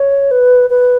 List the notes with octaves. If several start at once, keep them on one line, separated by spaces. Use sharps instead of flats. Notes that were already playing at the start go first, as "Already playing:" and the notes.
Already playing: C#5
B4
B4